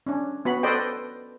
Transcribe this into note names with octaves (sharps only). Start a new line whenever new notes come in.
C#4 D4
B3 F#4 B5
A4 B4 C5 D5 D#5 G5